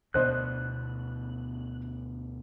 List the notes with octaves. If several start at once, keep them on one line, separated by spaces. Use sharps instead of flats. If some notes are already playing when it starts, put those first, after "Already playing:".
D2 B2 B3 D4 C5 D#5 F#6